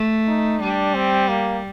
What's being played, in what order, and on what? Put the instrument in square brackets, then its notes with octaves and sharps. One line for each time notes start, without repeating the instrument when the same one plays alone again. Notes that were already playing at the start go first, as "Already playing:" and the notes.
Already playing: [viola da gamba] A3
[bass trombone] D#4
[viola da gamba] G3 [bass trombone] D4
[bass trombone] C4
A#3